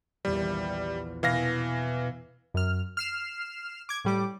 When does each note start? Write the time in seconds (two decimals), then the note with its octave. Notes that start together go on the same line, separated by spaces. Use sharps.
0.25 A#1 E2 E3 G3
1.23 B2 E3 F5 A#6
2.54 F#2 F6
2.97 F6 C7 E7
3.89 D6 G#6
4.05 A2 G3 D6